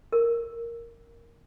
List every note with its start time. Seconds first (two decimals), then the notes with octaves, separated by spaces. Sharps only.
0.12 A#4